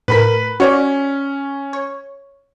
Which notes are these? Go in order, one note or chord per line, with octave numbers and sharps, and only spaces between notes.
A2 A#4 B4 B5 B6
C#4 F#4 C#5 D5
C#5